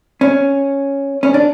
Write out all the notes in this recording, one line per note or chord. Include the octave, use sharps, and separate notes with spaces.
C#4
C#4
D4